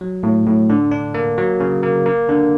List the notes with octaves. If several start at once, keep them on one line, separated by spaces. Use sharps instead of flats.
F#3
A2
A2
D3
D4
A#3
F#3
C#3
A#3
A#3
D3